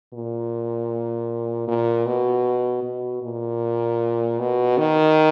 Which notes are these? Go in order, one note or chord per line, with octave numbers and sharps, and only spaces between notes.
A#2
A#2
B2
B2
A#2
B2
D#3